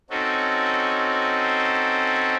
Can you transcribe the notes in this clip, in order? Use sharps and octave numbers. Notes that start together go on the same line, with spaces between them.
C4 C#4 D#4 F#4 A4